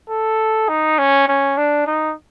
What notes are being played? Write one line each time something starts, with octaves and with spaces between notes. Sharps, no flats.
A4
D#4
C#4
C#4
D4
D#4